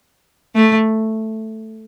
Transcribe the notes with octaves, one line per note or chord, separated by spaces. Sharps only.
A3